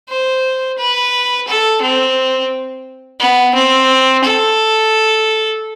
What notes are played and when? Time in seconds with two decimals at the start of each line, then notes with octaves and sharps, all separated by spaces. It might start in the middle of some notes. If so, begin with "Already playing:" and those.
0.09 C5
0.78 B4
1.48 A4
1.82 C4
3.20 B3
3.55 C4
4.24 A4